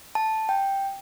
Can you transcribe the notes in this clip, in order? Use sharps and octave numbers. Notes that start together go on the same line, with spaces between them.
A5
G5